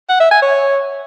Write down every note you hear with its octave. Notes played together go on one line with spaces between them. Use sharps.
F#5
E5
G#5
C#5